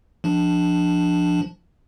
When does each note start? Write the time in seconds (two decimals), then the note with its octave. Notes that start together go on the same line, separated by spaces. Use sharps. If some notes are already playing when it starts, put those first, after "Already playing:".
0.24 F3 D4